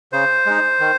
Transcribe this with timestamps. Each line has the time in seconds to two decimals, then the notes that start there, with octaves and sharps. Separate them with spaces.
0.13 C#3 C5
0.46 G#3 D#4
0.80 D#3